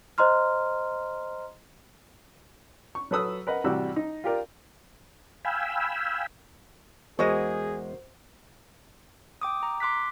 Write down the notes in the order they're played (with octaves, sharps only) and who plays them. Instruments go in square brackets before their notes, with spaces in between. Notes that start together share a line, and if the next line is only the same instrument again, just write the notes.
[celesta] C5 D#5 A#5 C6 F6
[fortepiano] C#6
F#3 A4 B4 D#6 E6
A#4 B4 D#5 F#5
A1 C3 G3 F#4 G4 E6
D#4
F4 G4 A#4 D5
[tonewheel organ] F5 G5 G#5 B5 E6
[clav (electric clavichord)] E2 G#3 [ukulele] F#4 A#4 D#5 [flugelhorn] G#4 [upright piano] C5
[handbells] G5 D6 D#6
A#5
C6 D6 F#6 B6